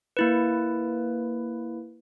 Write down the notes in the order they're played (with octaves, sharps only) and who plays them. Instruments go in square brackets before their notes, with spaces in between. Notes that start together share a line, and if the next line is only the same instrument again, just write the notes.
[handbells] A#3 E4 B4